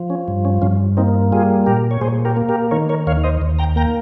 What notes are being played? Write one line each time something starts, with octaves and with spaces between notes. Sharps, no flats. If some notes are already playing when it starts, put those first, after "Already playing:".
Already playing: F3
C#4
G2
C#4
G2 C#4 F4
A#3 C4 D#4
G3 F4 G#4
A#2 G4 A#4
C#5
A#2 G#4 C5
G4 A#4
A#3
G4 A#4
D#3 A#4 C#5
A#4 C#5
D#2 C#5 F5
C5 D#5
D#2
G5 A#5
A#3 G5 A#5